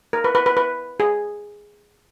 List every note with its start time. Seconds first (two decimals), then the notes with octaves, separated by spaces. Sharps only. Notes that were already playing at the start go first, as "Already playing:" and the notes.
0.13 A#4
0.24 B4
0.35 B4
0.46 B4
0.57 B4
1.00 G#4